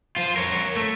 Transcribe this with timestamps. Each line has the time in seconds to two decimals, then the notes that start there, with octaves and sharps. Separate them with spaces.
0.16 F4 C5
0.36 A#4 C#5
0.77 A3